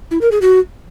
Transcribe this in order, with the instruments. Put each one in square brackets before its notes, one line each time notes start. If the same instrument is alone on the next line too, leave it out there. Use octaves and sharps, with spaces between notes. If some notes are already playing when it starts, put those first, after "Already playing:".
[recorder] E4
A#4
G#4
F#4